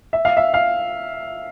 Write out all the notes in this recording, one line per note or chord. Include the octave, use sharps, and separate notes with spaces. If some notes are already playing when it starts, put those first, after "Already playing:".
E5
F5
E5
F5